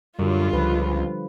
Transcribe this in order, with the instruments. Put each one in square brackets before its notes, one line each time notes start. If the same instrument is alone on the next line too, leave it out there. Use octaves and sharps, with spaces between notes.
[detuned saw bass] F#2 [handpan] D3 G3 [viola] F4
[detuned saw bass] C#2 [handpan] F3 B4